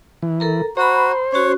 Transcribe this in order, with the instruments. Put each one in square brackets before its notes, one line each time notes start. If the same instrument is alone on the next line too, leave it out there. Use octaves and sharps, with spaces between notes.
[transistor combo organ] E3
[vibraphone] A4 A#4 A#5
[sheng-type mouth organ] F#4 [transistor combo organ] C5 [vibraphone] A#5 B5
[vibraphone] C#4 F#4 [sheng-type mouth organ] C#5